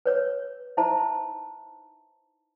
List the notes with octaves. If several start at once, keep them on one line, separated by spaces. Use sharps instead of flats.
B4 C#5 E6
D#4 E4 C5 E5 A5 A#5